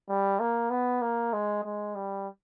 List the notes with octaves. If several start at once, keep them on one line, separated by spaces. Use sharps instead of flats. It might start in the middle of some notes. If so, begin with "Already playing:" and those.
G3
A#3
B3
A#3
G#3
G#3
G3